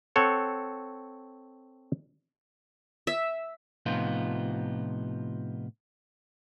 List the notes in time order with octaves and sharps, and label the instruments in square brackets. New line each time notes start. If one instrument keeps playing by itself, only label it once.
[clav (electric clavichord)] C4 A4 C#5 F#5
[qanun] E5
[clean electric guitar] A2 C3 F3 B3 D#4 F4